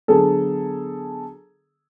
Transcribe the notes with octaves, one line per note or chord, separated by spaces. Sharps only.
D3 F#3 B3 G#4 A4